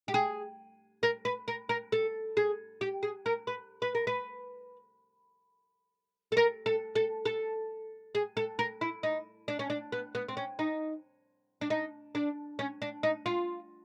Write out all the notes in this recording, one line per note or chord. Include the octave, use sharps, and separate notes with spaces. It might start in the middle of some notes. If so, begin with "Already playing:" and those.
G4
G#4
A#4
B4
A#4
A#4
A4
G#4
G4
G#4
A#4
B4
B4
A#4
B4
A4
A#4
A4
A4
A4
G#4
A4
A#4
E4
D#4
D4
C#4
D4
B3
B3
C4
C#4
D#4
D4
D#4
D4
C#4
D4
D#4
F4